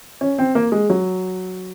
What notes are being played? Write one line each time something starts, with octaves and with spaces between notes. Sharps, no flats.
C#4
C4
A#3
G#3
F#3